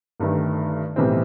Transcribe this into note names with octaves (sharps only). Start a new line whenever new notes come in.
G1 G2 D#3 A3
B1 A2 E3 G3 C4